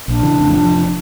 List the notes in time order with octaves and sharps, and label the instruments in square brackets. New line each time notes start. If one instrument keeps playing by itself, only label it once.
[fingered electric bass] A#1 [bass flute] D4
[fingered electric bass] C#3 E3
F2 A2
F1 F3